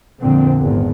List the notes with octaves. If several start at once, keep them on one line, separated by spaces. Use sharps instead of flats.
F2 A#2 D3 C4
G#1 E2